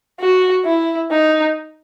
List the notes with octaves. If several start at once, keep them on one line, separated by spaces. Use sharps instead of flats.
F#4
E4
D#4